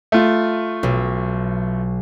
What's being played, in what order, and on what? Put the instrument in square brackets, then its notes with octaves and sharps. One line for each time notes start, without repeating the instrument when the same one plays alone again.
[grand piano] A3 F4
[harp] B1